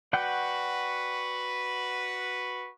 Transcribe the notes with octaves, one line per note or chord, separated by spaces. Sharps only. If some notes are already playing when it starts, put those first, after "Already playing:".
F#4 B4 D5 F#5 G5